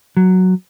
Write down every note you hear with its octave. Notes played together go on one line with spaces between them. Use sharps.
F#3